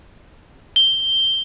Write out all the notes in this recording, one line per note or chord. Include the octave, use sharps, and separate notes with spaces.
G7